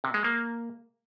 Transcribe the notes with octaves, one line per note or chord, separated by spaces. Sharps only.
C3
G#3
A#3